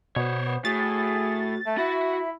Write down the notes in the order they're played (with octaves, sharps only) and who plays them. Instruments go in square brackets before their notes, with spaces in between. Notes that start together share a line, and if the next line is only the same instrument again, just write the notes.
[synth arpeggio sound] B2 [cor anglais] B3 [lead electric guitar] C5 C#5
[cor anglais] B3
[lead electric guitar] A2 [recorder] F#4 [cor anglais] G#4 [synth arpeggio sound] A6
[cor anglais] A3 [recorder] E5
[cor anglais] E4 [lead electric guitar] F#4 [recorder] E5